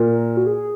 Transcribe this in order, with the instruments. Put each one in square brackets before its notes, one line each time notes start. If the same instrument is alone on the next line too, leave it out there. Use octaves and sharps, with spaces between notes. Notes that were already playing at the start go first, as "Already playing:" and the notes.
Already playing: [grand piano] A#2 [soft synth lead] A#4
[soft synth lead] F#4
G#4